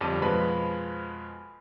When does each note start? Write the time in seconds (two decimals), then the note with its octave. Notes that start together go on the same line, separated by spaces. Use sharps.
0.01 G1 F2 G3 A5 D6 D#7
0.22 F2 B2 F3 G#3 B4 B5